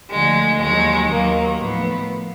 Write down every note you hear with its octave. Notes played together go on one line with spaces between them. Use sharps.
D2 D3 F3 G#3
D#2 D#3 F#3 G#3
D#2 D#3 F#3 A#3
A2 F3 B3